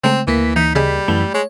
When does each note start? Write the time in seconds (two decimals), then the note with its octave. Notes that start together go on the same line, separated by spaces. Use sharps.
0.04 C#3 G#3 A3 C4
0.27 D2 E3 A#3 B6
0.56 E3 D#4
0.75 C#3 G3 G#4 D#5
1.08 F#2 E3 A3 B5
1.34 G#3 C#5